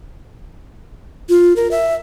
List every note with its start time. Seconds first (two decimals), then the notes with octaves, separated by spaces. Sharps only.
1.29 F4
1.56 A#4
1.71 E5